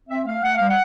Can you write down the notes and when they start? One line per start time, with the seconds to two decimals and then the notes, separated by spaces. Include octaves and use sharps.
0.08 C4 E5
0.26 A3 F5
0.43 A3 F#5
0.55 F5
0.60 G3
0.68 F#5